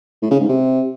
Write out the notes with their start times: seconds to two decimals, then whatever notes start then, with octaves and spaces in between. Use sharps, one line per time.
0.22 A2
0.31 C#3
0.40 G#2
0.49 C3